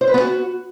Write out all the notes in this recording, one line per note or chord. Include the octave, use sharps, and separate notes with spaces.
C5
B4
B3
F#4